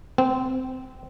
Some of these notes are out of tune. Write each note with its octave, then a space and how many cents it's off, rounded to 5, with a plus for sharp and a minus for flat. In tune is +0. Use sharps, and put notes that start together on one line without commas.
C4 -20